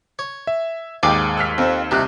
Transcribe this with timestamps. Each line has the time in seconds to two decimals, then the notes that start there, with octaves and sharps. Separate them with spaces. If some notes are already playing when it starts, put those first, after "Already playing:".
0.19 C#5
0.47 E5
1.03 D#2 G#2 D5 F5 G5 G#5
1.37 E6 F6 B6
1.58 F2 C4 C5
1.91 C2 C3 D#3 G4 F#6